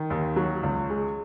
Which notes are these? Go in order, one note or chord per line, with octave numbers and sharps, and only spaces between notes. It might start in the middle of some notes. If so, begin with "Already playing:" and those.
Already playing: D#3
D#2
F#3
C#2
G#3